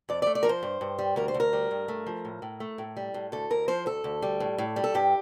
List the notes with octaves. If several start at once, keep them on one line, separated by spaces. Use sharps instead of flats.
F2 D5
D5
A3
D5
F3 A#4
C5
G2
G2
G3
D2 A#4
C5
D2
A#4
G3
G2
A3
F3
A2
A2
A3
A2
G3
A2
D2 A4
D2 A#4
F3 C5
D2 A4
D2
G3
A2
A2
G3
A4
G2 G4